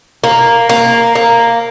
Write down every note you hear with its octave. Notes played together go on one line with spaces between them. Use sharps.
A#3
A#3
A#3